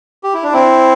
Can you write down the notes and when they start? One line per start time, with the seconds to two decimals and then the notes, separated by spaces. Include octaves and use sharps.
0.24 G4
0.34 E4
0.43 D4
0.53 C4 E4